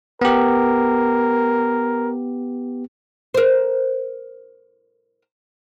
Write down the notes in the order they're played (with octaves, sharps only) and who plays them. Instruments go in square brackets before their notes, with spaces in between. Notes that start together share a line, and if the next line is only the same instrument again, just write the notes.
[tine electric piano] B3 G4 [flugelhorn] A#4
[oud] A#4 C5